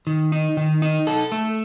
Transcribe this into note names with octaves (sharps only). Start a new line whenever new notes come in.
D#3
D#4
D#3
D#4
A4
A3